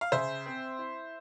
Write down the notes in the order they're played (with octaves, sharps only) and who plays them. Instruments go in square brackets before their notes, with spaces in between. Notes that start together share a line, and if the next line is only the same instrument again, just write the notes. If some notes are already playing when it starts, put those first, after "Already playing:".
[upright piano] F5
C#3 C5 E5
C4
E4